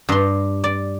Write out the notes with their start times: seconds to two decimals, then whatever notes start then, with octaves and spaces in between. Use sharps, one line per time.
0.09 G2 C6
0.64 D5